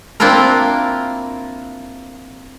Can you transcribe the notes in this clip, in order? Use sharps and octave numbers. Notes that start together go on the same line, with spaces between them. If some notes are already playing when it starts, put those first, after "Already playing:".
A#3 C4 D4 E4 F4 A#4